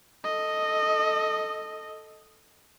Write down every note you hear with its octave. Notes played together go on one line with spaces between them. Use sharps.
A4 D#5